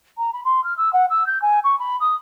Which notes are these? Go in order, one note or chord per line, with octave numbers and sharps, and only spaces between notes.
A#5
B5
C6
F6
E6
F#5
E6
G6
G#5
C#6
B5
D#6